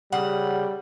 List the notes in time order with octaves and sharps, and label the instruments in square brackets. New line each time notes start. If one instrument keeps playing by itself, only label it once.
[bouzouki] C#3 [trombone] G3 [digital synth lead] F#5